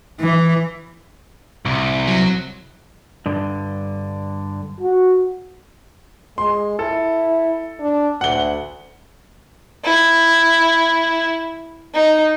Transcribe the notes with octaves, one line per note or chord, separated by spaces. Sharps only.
E3
C2
F#3
G2 D3
F#4
G#3 C6
E4 A4
D4
D2 F#5 G7
E4
D#4